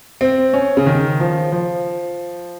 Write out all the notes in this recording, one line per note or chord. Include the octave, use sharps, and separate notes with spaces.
C4
C#4
C#3
D#3
F3
F3